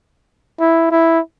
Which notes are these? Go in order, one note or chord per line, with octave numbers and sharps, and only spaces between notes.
E4
E4